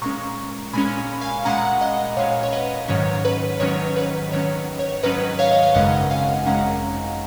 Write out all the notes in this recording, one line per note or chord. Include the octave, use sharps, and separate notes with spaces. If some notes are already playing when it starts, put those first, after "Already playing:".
A#2 G#3 C#4 A#5 C#6
A#2 G#3 C#4 G#5 B5
F5 G#5
A#2 G#3 C#4 F#5 A#5
D#5 F#5
A#2 G#3 C#4 C#5 F5
C#5
B4 D#5
G#2 D#3 F#3 C#4 C#5
B4
G#2 D#3 F#3 C#4 C#5
B4
G#2 D#3 F#3 C#4 C#5
C#5
G#2 D#3 F#3 C#4 B4 D#5
C#5 F5
D#5
F5
G#1 F#2 C#3 G#3 C#4 D#5 F#5
F5 G#5
G#1 F#2 C#3 G#3 C#4 F#5 A#5